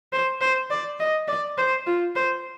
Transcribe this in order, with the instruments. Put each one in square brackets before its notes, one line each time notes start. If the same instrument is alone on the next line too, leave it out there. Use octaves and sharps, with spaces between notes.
[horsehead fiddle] C5
C5
D5
D#5
D5
C5
F4
C5